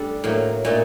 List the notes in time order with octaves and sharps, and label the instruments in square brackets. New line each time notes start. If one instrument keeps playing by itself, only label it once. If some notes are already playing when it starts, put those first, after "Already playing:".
Already playing: [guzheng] G3 A3 D4 A4 D5
A2 F#3 A#3
A#2 A3 D#4